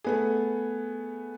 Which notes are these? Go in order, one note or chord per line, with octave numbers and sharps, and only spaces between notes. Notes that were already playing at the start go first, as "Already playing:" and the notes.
A3 B3 G#4